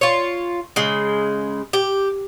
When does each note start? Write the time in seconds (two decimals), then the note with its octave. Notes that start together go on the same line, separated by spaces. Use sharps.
0.01 F4 C#5
0.76 C#3 G#3
1.73 G4